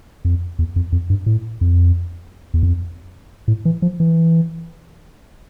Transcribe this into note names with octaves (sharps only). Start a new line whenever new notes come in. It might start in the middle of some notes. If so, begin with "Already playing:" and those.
F2
E2
F2
F2
G2
A2
F2
E2
F2
A2
E3
F3
E3